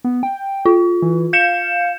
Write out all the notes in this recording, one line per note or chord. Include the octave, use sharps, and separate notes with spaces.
B3
G5
F4
E3
F5 G6 C#7 E7